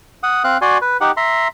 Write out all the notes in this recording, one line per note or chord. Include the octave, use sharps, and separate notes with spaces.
F#5 D#6
C4 F5 F#6
F#4 D5 G#5 C6
B4
D#4 G4 F#5
E5 A#5 C6